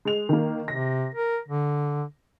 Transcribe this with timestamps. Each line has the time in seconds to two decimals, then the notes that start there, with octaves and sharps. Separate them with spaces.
0.05 G#3 F7
0.29 D#3 A#3
0.68 C3 A#6
1.15 A#4
1.48 D3